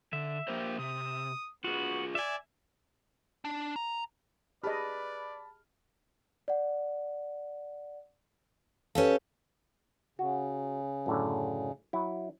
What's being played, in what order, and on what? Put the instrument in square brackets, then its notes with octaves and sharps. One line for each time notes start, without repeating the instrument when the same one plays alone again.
[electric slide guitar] D3 [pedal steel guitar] E5
[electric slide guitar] A#3 A#4 C5 [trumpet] G4
[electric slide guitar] C3 [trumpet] D#6
[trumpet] B3 [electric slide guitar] F4 G#4 [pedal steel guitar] F#4
[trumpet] D5 [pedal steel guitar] E5 G#5
[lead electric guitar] D4
A#5
[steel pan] G4 G#4 D#5 [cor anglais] B4 [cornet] D5 [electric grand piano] A5 B5 F6
[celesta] D5 F#5
[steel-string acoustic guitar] C#4 G4 A4 [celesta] B4 F5
[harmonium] C#3 [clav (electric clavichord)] F#4
[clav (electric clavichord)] F#2 A2 D3
F#3 E4